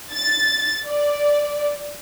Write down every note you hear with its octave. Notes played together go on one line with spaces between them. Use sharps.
A6
D5